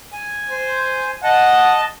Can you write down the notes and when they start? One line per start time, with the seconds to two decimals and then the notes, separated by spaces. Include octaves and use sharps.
0.12 G#5
0.51 C5
1.24 D#5 F#5 A5